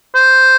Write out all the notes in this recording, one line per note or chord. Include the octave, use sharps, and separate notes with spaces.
C5